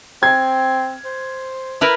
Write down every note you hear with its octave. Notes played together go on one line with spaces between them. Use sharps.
C4 G#6
C5
E4 A#4 B4